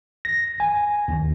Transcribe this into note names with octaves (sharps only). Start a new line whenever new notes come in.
A#6
G#5
D#2